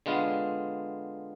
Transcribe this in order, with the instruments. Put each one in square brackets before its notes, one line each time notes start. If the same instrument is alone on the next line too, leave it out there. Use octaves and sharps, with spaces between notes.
[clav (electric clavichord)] D3 G#3 B3 F4